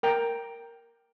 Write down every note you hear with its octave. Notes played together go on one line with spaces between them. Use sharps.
A#4 G5 A#5